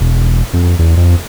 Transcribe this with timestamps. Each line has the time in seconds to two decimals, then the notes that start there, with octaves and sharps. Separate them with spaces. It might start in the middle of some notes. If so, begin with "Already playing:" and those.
0.01 E1
0.54 F2
0.79 E2
0.97 F2